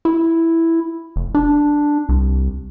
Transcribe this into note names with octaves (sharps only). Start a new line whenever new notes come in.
E4
F1
D4
C2